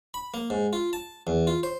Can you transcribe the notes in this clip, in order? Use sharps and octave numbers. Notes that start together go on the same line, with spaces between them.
B5
A#3
G#2
F4
A5
E2
F4
C5